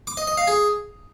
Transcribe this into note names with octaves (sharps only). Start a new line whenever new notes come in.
D6
D#5
D#5
F5
G#4